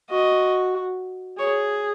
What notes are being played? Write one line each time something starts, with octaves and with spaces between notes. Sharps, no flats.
F#4 D#5
G#4 C#5